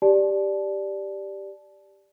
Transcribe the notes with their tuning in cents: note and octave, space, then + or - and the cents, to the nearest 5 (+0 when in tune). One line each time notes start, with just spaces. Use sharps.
G4 +0 D5 +0 A5 -25